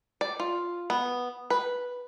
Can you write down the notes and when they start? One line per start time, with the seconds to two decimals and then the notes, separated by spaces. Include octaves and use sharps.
0.21 D5
0.40 F4
0.90 B3
1.50 B4